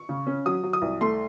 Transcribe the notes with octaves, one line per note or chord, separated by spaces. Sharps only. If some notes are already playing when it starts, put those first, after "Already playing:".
Already playing: C#6
C#3
C#4
F#3 D#6
F#3
D#6
C2
A3 C6